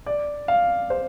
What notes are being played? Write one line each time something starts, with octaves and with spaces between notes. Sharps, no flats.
D5
F5
C5